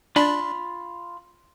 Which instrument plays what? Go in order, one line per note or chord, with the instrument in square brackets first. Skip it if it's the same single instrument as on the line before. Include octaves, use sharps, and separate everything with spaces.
[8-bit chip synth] D4 [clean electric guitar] F4 B5